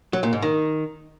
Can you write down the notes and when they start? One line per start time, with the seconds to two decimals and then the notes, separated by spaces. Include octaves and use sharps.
0.13 F#3
0.23 A#2
0.33 G#2
0.42 D#3